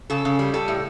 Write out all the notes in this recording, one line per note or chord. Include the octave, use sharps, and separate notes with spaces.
C#3 A4
C#3
G3
G3 A4
A2